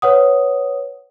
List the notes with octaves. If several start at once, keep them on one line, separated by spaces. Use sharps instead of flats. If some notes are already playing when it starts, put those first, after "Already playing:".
B4 C#5 F#5 D#6